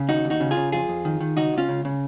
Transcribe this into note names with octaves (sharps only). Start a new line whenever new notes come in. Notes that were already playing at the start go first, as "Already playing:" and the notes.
Already playing: C#3
D#2 D#4 F#4
D#2
D#4 F#4
C#3
F4 G#4
C#3
F2 F4 G#4
F2
D#3
D#3
C#2 D#4 F#4
C#2
C#4 F4
C#3
C#3